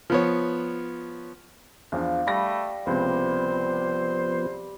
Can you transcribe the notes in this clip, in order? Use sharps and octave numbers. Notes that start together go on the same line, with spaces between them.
F3 B3 C#5
E2 F3 D4 F5
G3 A3 B5 A#6
C#2 C3 F3 B3 C5